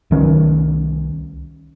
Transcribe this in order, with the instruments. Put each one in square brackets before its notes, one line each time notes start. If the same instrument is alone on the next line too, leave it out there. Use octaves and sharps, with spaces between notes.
[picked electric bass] C2 D#3 C#4